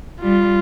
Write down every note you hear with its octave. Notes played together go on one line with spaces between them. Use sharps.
G3 F4